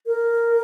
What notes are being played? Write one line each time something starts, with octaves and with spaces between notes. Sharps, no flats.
A#4